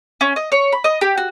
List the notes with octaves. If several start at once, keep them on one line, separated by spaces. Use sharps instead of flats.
C#4
D#5
C#5
B5
D#5
G4
F#4